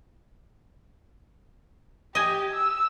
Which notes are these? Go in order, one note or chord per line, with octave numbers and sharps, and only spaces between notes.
G4 D#5 G#5
E6